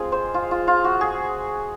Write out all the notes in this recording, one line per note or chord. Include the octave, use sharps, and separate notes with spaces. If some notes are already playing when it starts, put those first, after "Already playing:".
Already playing: G#3 C4 F4 G#4
C5
F4
F4
F4
F#4
G#4